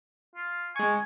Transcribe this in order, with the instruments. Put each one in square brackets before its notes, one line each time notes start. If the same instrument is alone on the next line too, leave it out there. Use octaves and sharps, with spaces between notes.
[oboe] F4
[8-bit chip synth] G#3 C#6 [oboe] G#5